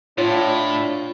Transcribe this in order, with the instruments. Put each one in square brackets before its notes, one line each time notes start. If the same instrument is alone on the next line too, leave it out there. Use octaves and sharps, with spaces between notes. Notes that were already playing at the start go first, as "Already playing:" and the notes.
[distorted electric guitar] A2 [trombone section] D4 [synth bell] F4 [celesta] C#5